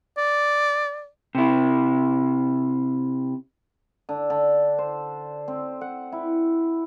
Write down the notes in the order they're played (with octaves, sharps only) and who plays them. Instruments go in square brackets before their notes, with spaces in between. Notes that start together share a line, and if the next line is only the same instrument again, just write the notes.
[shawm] D5
[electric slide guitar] C3 E4
[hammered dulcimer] D3
D3
C5
C4
F#5
E4